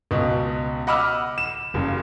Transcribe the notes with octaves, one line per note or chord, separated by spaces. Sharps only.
C#2 B2
D#5 F#5 B5 D6 E6 F6
E7
F#1 C#3